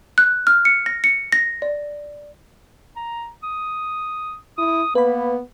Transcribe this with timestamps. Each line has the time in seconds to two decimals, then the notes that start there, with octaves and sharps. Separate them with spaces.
0.18 F#6
0.47 F6
0.65 C#7
0.86 A#6
1.04 C#7
1.32 A#6
1.62 D5
2.96 A#5
3.43 D#6
4.58 E4 D#6
4.95 A#3 B3 B4 B5